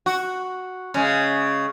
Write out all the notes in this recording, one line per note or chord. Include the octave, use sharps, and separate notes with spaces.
F#4
C#3 G#3